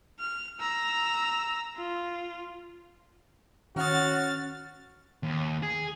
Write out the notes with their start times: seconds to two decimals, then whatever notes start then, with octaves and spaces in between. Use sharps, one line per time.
0.20 F6
0.60 A#5 E6
1.77 F4
3.76 D#3 C#4 F#4 F#5 D#6 F6 A6
5.23 D#2
5.63 G#4